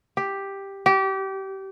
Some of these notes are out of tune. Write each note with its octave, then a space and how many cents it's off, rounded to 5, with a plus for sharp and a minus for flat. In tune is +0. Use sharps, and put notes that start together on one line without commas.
G4 +5
G4 -25